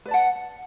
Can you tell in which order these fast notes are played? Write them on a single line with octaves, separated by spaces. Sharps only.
B4 D5 A5 F#5